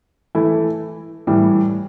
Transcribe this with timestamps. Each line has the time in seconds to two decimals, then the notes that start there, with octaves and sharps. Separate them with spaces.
0.35 E3 A3 E4
1.27 A2 E3 G3